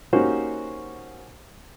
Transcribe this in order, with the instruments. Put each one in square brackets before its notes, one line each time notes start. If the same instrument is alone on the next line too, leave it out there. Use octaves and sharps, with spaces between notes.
[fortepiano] A#3 C#4 D#4 F#4 G4 C5